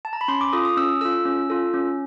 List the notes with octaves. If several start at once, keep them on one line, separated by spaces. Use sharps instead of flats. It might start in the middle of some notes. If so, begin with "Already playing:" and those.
A5
A#5
B5
C#4 C6
D6
F4 A4 D#6
D#6
C#4 E6
F4 A4 E6
C#4
F4 A4
C#4